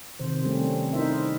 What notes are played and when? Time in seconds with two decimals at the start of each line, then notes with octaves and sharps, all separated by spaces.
0.20 C3 D#3 C5
0.44 G3 A3 C4 C#4
0.93 D#4 E4 A#4 C5 E5